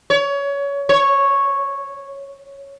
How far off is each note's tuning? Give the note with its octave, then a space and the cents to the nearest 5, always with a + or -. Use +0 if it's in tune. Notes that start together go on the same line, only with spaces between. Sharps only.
C#5 +25
C#5 -5